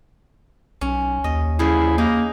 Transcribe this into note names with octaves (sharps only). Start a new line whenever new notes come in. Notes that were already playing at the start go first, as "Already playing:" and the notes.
B1 C#4
D#2 D#5
C#3 F3 E4 G#4
A#3 D#4